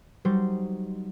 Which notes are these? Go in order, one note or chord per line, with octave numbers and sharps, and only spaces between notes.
F#3 G3 D#4 C5